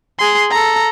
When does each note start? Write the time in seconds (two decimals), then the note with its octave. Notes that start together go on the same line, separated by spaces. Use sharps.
0.19 G#4 C6
0.51 A4 A#5